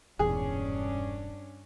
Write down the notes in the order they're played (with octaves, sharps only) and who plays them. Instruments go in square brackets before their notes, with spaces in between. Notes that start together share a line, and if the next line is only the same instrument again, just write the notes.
[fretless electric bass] E1 E2 A#2 [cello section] G2 C#4 D4 [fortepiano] G#4